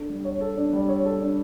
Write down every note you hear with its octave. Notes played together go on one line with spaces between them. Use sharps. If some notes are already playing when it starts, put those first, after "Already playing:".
Already playing: D4 A4
G3
C#5
A4
D4
G3
C#5
A4
D4